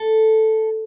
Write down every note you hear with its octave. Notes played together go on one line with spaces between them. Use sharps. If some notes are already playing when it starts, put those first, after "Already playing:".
Already playing: A4